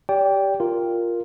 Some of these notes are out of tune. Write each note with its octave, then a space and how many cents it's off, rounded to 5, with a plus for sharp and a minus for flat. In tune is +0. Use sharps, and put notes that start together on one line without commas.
G4 +0 D5 -30 G5 +5
F4 +0 A#4 +0